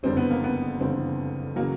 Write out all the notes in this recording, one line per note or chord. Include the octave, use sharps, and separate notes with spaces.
F#1 F2 D3 G3 C4
B3
A#3
B3
F#1 F2 D3 G3 C4
C#3 F#3 A#3